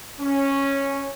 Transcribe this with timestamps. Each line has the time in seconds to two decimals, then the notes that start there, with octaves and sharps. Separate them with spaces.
0.20 C#4